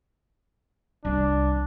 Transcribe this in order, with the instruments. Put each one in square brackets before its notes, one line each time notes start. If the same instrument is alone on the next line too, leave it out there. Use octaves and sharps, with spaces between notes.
[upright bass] C2 D#3 [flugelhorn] D4